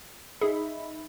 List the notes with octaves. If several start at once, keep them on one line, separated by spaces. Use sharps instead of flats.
D#4 G#4 E5 B5